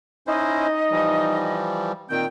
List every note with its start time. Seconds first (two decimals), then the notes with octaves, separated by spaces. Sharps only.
0.27 C#4 D#4 E4 C5 D#5
0.91 E3 F3 G3
2.10 A#2 D#3 C4 G5